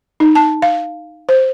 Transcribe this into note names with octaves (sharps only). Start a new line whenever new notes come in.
D#4
A5
F5
C5